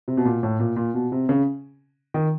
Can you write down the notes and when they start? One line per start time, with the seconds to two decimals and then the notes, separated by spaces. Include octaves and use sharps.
0.08 C3
0.17 B2
0.25 A#2
0.43 A2
0.60 A#2
0.76 A#2
0.94 B2
1.12 C3
1.29 C#3
2.14 D#3